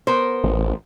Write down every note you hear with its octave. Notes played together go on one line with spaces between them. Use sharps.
B3 A#4 C5
A1